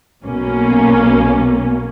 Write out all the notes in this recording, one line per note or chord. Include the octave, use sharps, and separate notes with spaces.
B1 B2 A#3 C#4